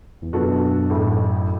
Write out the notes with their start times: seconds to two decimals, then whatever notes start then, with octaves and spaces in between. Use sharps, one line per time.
0.22 E2
0.33 F#2 B2 B3 D4 F#4 A4
0.90 A1 A2 A3